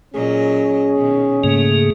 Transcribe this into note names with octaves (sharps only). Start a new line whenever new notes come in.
A#2 F#3 C#4 G#4 D#5
B2 D#3
G#2 C#3 A3 A#3 G#4